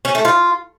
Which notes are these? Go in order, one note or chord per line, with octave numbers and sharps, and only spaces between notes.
C#4
A3
F4